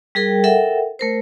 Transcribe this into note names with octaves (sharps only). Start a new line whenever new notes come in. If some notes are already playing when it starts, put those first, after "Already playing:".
G3 G#4 A#4 G5
A4 A#4 E5 F#5 G5
A3 A#4 C5